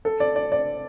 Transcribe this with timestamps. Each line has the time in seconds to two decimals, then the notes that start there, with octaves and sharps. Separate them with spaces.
0.05 A4
0.20 D5
0.36 D5
0.52 D5